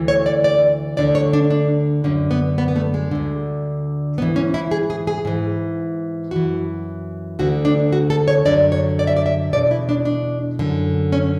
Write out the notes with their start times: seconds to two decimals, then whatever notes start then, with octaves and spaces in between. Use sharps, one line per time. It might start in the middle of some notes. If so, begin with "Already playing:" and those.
Already playing: D2 E3
0.08 C#5
0.26 D5
0.44 D5
0.97 D2 D3 D5
1.15 C#5
1.33 D4
1.50 D4
2.04 F#2 D3 C#4
2.31 B3
2.58 B3
2.68 B3
2.76 A3
2.94 G#3
3.11 D2 D3
4.18 G#2 B3
4.22 E3
4.36 C#4
4.54 E4
4.71 G#4
4.90 G#4
5.07 G#4
5.25 G#2 E3
6.31 F#2 E3 F#4
7.39 D2 D3 F#4
7.65 D4
7.93 F#4
8.10 A4
8.28 C#5
8.45 F#2 D3 D5
8.72 C#5
8.99 D5
9.07 E5
9.17 D5
9.26 E5
9.53 E2 B2 D5
9.71 E4
9.89 D4
10.05 D4
10.59 F#2 D3
11.12 C#4